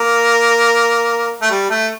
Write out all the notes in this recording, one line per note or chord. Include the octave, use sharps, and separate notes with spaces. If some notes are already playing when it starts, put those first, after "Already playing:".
Already playing: A#3
A3
G3
A3